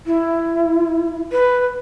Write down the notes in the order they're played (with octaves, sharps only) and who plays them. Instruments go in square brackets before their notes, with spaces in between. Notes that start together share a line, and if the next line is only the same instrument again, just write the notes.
[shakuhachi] E4
B4